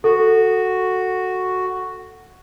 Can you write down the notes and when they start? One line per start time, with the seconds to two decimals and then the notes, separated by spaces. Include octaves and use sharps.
0.04 F#4 A4